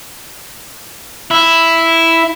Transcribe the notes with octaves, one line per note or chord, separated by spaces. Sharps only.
E4